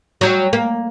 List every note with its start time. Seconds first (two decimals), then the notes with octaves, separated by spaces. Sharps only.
0.21 F#3 G3
0.53 A#3